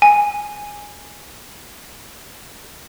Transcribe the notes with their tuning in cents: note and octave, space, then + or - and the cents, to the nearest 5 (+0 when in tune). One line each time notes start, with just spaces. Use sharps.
G#5 -5